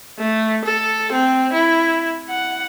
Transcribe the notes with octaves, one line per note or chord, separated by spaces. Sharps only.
A3
A4
C4
E4
F#5